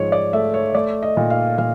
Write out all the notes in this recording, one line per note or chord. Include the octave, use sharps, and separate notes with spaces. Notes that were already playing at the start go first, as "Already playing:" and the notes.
Already playing: G#2 F3 C#5
D5
A3 E5
C#5
A3 D5
D#5
A#2
F5
A#2 F5